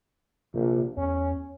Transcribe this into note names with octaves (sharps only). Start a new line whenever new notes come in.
A#1 C3
E2 C#4